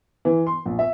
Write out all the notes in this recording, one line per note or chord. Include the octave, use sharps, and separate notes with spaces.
E3
C6
A#1
E5